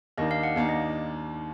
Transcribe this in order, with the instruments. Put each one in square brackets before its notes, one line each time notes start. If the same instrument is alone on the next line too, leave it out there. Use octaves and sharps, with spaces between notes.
[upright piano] D#2 D#3 A#3 D4 [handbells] D#5
[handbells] F5
F#5
[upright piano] D#2 D#3 A#3 D4
[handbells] D#5